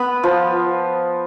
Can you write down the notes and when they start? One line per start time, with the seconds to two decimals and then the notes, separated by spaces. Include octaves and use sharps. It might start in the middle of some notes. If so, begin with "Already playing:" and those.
Already playing: B3 B4
0.23 F3